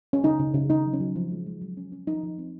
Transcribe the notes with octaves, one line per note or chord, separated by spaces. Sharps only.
C#4
C#3 D#4
C#3
C#3
D#3 D#4
F#3
C#4
F#3
F3
G#3
G#3
F#3
C#4
C#4
F3 D#4
F3
C4